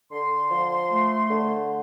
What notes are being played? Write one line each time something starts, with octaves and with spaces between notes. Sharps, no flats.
D3 C6
F3
A3
D3